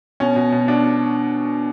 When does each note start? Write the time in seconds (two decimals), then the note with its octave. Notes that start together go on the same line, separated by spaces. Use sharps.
0.20 B2 C#4
0.36 B2
0.52 B2
0.68 B2 D4